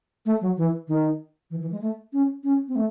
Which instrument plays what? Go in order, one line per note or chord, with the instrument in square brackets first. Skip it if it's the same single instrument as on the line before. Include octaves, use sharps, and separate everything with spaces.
[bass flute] A3
F#3
E3
D#3
E3
E3
G#3
A3
C#4
C#4
C4
A3